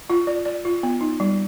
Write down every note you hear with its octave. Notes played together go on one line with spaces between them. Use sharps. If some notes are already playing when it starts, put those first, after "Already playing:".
F4
D5
D5
F4
B3
D#4
G3